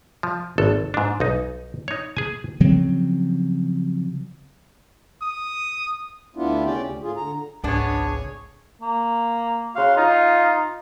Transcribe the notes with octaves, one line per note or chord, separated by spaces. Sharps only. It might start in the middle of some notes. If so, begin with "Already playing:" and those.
F3
G#1 A4
G#2 D4
B1 D#4
D#4 C#5
G#4 G#5
C#3 F3 F#3 C4
D#6
D2 B3 D4 E4 F4
C#3 C#4 G4 D5 G5
D2
A2 F4 G#4
D3 A#5
G#1 C#2 G#3 B3 D4 G#4 C#5
A#3
C#3 F#4 F5 C6
D#4 F4